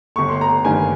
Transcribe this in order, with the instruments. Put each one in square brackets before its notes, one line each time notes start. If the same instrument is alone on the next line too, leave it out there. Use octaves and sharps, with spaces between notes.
[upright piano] G1 C#6
C6
A#5
G2 D#3 G#5